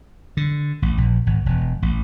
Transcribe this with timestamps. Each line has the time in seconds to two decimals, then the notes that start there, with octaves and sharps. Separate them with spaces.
0.37 D3
0.82 A1
0.98 A#1
1.27 G#1
1.46 E1
1.82 A1